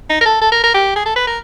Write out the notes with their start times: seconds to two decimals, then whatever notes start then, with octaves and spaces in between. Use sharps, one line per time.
0.10 D#4
0.21 A#4
0.25 A4
0.41 A4
0.52 A#4
0.63 A#4
0.74 G4
0.96 G#4
1.05 A4
1.16 B4
1.27 A#4